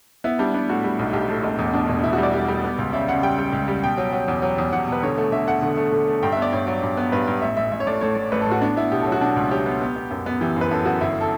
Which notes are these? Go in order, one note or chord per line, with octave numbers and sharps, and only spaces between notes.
B3 E4
G3 D4
B3 D4
A2 F#4
G3
B1
B1 G4
A2
E1
E2
B2 D4
E1
E1 E4
F#4
G3 D5
G3
G3
B3
C#2
C#3 E5
C#3 F#5
G3 G5
G3
C#2
G3
B2 G5
F#3
F#3
E2
F#3
E2
E2 F#5
B2 B4
D3 C#5
A3
D3 E5
A3 F#5
D3
A3
D3
A3
G2 G5
E5
B3
D5
G2 C#5
F#3
G2
B3
G2 B4
G2
A1 E5
A1 E5
A1 E5
C#5
A2 D5
A2 C#5
A2
A1 B4
A4
A2 F#4
B3 D4
B3 E4
B2 G4
A4
F#3
F#4
B2 D4
C#2
F#3 G4
B3
B3
B3
F#2
B3
E3 G4
F#2 B4
F#2 A4
F#2 F#4
G1 E4
A4